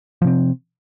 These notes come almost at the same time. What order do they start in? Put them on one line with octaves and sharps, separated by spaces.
F3 C3 C4